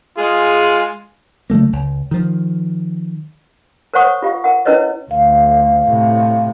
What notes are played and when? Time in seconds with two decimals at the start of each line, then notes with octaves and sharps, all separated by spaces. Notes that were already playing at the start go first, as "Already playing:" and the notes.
0.18 G#3 F4 G#4
1.50 C#3 F#3 A3 A#3
1.73 C#2
2.11 D#3 F3
3.94 A#4 C5 C#5 F#5 C#6 D#6
4.22 F4 G4 F5
4.44 A#4 F#5
4.65 C#4 E4 A#4 B4 C#5 D#5
5.11 D2 F5
5.87 A2 C3